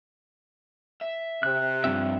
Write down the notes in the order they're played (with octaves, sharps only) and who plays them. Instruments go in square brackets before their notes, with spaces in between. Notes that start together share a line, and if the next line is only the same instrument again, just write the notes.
[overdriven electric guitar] E5
[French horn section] C3 [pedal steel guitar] F#6
[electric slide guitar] G2 C4 E5 [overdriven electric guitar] C#3 F3